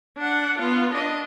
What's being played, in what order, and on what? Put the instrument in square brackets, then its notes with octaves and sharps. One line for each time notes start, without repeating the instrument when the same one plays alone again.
[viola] D4 F#5
B3 F4
D4 D#5